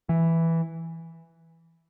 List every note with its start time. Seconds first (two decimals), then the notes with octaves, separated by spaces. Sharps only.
0.09 E3